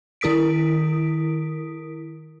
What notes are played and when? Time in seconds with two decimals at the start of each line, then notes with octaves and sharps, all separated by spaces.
0.21 D#3 E4 A#4 D#6 B6 D7